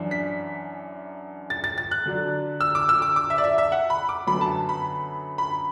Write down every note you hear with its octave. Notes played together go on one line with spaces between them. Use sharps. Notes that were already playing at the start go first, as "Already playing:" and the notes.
Already playing: F#2 E3 D4
B6
A6
A6
A6
F#6
D3 F#3 D4
E6
D6
E6
D6
D6
E5
D5
E5
E5
F#5
B5
D6
F#2 D3 F#3 B3 B5
A5
B5
B5